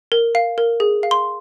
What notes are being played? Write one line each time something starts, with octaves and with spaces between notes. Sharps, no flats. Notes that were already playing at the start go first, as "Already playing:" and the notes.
A#4
F5
A#4
G#4
F5
C6